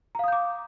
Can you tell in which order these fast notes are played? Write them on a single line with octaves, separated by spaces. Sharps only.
A#5 F5 D#6 G6 D6